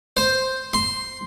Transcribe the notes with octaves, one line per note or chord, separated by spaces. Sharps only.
C5
C6